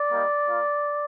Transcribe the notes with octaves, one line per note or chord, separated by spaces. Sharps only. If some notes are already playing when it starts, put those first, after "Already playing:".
Already playing: D5
G3 A#3 D#4
A#3 F4